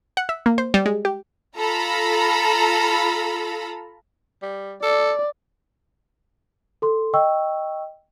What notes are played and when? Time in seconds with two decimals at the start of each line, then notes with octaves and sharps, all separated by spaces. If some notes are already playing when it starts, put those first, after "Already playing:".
0.17 F#5
0.29 E5
0.46 A#3
0.58 C5
0.74 G3
0.86 G#3
1.05 G4
1.57 F4 A4 A#5 B5
4.42 G3
4.83 A4 D5
6.82 A4 C6
7.14 D#5 G5 C#6 E6